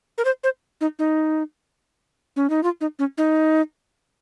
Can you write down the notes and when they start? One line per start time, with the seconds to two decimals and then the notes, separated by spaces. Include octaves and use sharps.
0.18 A#4
0.25 C5
0.44 C5
0.81 D#4
0.99 D#4
2.36 C#4
2.50 D#4
2.63 F4
2.81 D#4
2.99 C#4
3.18 D#4